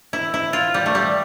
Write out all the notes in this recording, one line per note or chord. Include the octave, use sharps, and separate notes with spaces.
E4
E4
F4
G3
A3
G3